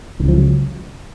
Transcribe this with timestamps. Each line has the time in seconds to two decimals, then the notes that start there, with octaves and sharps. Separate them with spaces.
0.19 C#2 D#3
0.23 C#3
0.28 F3
0.38 F#3